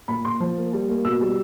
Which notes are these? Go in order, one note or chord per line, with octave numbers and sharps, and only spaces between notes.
A#2 B5
A#2 C6
F3
A#3
G3
A#3
B2 E6
G3